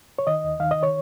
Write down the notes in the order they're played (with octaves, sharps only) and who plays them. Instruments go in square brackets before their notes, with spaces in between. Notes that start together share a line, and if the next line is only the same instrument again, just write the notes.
[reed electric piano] C#5
D#3 D#5
D#2
D#3 F5
D#5
C#5